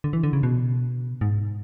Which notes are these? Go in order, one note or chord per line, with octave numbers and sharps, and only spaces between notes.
D3
E3
D3
C#3
B2
G#2